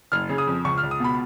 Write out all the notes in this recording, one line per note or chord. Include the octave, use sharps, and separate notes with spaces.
F#1 F6
C#3
D#6
F2
C#2 C#6
F6
C#2
D#6
B2 B5